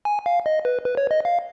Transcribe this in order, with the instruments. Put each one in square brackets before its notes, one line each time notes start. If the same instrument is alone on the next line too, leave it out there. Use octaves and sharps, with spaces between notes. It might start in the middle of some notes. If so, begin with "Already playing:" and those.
[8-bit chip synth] G#5
F5
D#5
B4
B4
C#5
D#5
F5